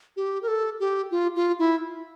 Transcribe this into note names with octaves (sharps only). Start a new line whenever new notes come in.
G4
A#4
A4
G4
F4
F4
E4